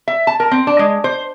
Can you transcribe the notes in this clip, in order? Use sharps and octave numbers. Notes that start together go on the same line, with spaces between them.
E5
A5
A#4
C4
D4
G#3
C5